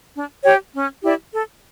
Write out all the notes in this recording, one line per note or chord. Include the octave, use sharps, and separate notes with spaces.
D4
G4 C#5 G5
C#4
E4 G4 D5
A4